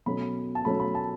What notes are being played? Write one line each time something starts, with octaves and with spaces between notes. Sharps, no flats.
B2 F#3 A3 C#4 B5
A5
B2 F#3 A3 C#4 B5
B5
A5